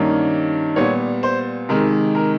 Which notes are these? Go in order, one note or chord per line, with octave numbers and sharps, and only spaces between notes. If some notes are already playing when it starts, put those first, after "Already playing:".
Already playing: G2 D#3 G3 A#3 C#4
A#2 G3 B3 C#5
C5
C3 D#3 G#3 A#4
A#4